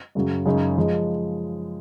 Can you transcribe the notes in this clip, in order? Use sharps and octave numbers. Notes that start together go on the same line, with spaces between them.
F#2 C#3 F#3
F#2 C#3 G#3 D#4
F3 G#3